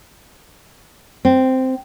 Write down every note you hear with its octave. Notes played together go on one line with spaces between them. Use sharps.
C4